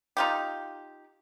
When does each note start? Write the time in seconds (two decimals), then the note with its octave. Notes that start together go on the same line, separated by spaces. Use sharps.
0.17 D#4 F4 G4